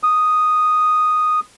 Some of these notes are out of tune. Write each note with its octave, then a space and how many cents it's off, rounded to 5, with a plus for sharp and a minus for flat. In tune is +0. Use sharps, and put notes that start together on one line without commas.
D#6 -5